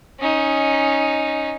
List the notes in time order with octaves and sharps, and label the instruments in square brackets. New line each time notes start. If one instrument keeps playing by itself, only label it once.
[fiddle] C#4 D#4